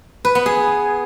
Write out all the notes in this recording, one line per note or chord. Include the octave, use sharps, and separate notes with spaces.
B4
B3
G#4